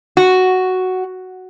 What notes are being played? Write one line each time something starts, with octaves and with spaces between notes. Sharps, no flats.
F#4